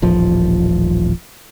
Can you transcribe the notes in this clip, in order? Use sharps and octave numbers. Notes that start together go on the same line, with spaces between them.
D#1 A1 F3